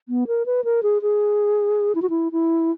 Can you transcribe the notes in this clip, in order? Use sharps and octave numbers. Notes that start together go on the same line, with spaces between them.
B3
A#4
B4
A#4
G#4
G#4
E4
F#4
E4
E4